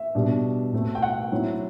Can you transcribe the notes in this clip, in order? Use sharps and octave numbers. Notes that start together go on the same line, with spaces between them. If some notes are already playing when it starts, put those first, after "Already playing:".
Already playing: E5
B2 G3 D4
B2 A3 C4
G5
F#5
F#3 A3 C4 E4